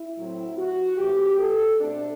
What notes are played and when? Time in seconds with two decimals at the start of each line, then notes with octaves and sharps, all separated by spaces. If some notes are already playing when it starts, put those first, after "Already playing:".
Already playing: E4
0.17 A2 F#3 C4
0.57 F#4
0.98 A2 E3 A3 C4 G4
1.39 A4
1.80 B2 A3 C4 D4